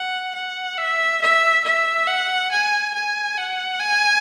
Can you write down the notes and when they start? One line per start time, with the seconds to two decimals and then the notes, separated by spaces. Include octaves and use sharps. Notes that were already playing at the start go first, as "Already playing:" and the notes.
Already playing: F#5
0.35 F#5
0.78 E5
1.21 E5
1.64 E5
2.07 F#5
2.51 G#5
2.94 G#5
3.37 F#5
3.80 G#5